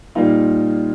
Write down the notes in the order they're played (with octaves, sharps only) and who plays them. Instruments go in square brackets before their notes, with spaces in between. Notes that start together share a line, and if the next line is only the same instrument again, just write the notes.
[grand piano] A#2 G3 A#3 D#4 F4